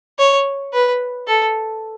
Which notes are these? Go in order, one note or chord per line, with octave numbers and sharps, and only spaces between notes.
C#5
B4
A4